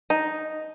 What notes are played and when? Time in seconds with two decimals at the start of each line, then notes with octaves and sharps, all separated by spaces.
0.10 D#4